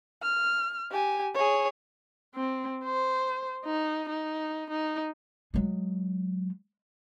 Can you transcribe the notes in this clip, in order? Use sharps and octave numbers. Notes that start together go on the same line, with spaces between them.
F6
G4 G#5
G#4 C#5
C4
C5
D#4
D#4
D#4
F#3 G#3